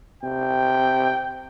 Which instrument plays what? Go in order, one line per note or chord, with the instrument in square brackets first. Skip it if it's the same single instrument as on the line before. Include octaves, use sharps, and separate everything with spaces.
[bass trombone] C3 [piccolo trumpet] G5